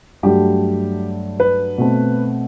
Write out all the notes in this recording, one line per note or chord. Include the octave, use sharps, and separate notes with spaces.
G2 F#3 A3 G4
B4
B2 A3 C4